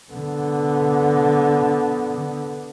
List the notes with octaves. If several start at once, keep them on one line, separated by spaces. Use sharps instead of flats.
D3 B3